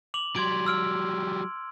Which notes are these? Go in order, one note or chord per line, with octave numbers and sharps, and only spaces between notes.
D6 F7 F#7
F#3 G3 C6 G#6 D7
E6 F6 D7